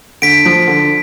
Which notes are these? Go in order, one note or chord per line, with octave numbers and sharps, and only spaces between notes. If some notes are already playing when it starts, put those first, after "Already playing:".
D3 B6 D7
F3
D3